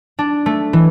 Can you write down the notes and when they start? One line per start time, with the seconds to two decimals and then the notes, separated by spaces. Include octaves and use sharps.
0.19 D4
0.46 A3
0.73 E3